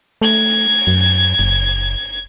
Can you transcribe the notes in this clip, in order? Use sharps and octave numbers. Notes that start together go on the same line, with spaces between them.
A3 G#6
F#2
F#1